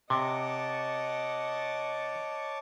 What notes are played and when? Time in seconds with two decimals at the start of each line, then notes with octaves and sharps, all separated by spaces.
0.10 C3 C#5 D#5 F#5 A5 D6